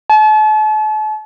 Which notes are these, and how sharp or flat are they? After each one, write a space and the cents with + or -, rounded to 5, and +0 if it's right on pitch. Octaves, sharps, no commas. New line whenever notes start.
A5 -40